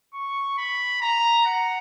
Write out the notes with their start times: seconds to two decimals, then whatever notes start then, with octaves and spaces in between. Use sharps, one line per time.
0.13 C#6
0.58 B5
1.02 A#5
1.46 F#5